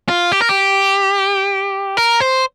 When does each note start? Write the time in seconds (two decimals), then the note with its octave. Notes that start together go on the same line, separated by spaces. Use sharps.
0.09 F4
0.32 G4
0.41 A#4
0.49 G4
1.97 A#4
2.20 C5